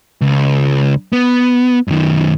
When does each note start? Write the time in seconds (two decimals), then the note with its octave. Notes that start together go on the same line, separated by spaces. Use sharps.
0.21 C#2
1.13 B3
1.88 F#2 D#3